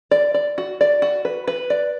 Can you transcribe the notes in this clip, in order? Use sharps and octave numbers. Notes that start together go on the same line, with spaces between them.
D5
D5
F#4
D5
F#4
B4
B4
D5